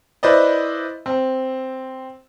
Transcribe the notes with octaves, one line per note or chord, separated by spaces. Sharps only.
E4 B4 C5 D5 D#5
C4